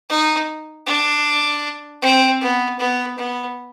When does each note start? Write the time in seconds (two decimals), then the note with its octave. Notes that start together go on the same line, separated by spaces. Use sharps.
0.10 D#4
0.87 D4
2.02 C4
2.41 B3
2.79 B3
3.17 B3